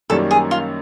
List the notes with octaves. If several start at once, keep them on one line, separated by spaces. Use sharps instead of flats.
F#2 D#3 G3 A#3 C#4 A4
G#4
F4